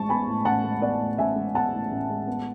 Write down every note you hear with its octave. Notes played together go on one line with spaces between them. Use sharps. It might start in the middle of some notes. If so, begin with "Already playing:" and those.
Already playing: A1 A2 G#3 A5 C#6
B3 G#5 B5
A2
A1 F#5 A5
G#3
B3 D5 F#5
A2
A1 E5 G#5
G#3
B3 F#5 A5
A2
A1
G#3
B3